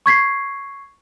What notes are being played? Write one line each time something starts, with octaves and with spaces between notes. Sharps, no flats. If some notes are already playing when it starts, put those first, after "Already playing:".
C#6 G#6 B6 C7